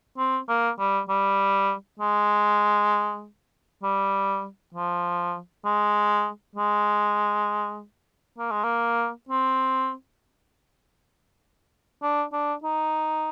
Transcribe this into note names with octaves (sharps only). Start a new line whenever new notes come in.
C4
A#3
G3
G3
G#3
G3
F3
G#3
G#3
A#3
G#3
A#3
C4
D4
D4
D#4